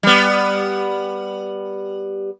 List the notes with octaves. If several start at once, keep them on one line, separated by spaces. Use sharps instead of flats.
G3 B3